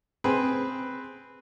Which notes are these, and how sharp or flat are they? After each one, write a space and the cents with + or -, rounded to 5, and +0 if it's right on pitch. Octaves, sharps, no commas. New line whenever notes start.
C4 +0 G#4 +0 B4 +0